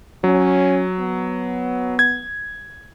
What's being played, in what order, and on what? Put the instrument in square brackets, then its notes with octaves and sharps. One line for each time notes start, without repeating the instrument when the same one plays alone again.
[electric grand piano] F#3 [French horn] C#4
[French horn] B3
[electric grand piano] G#6